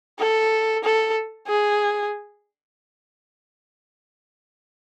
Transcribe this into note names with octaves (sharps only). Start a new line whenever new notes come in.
A4
A4
G#4